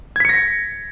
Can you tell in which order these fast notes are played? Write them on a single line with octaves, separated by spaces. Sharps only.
G#6 B6 C#7 A#6